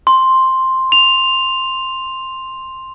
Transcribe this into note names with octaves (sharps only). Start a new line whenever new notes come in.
C6
F7